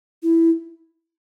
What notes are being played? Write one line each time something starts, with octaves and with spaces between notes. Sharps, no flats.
E4